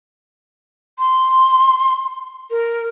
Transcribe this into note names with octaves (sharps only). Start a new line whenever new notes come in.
C6
A#4